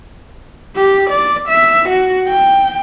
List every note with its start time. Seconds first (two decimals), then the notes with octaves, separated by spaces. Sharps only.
0.77 G4
1.10 D5
1.48 E5
1.89 F#4
2.29 G5